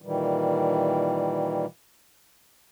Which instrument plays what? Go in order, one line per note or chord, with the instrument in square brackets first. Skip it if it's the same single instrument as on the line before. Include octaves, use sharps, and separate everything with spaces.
[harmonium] A#2 D#3 E3 G3